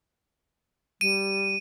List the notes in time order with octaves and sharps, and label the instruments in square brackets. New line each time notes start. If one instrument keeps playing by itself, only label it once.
[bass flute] G3 [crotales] D#7